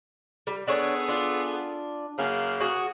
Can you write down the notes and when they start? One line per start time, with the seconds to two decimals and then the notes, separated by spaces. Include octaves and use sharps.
0.47 G3
0.68 B3 D4 G#4 A4 C#5
1.09 D4 F4
2.19 F#2 C#3 A#3
2.60 F#4 G#4